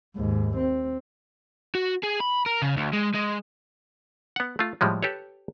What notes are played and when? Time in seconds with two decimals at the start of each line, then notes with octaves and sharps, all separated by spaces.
0.16 D#2 G#2
0.57 C4
1.75 F#4
2.03 G#4
2.20 B5
2.46 A#4
2.62 C#3
2.77 D2
2.93 G#3
3.15 G#3
4.36 B3 F#5
4.59 A3 F4
4.81 A2 F3 G3 G#3
5.03 G4 A4 B4 C#5